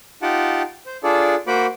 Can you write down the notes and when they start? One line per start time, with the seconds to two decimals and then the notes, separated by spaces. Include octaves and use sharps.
0.22 D#4 F4 G4 F#5 G5 A5
0.86 C5
1.04 D4 F4 G#4 A4 D5
1.47 A#3 F#4 C5 B5 D6